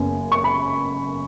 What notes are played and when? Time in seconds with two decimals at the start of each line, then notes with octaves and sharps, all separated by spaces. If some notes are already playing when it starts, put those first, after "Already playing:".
Already playing: F#1 F#2 C#3 B3 G#5
0.32 C#6
0.44 B5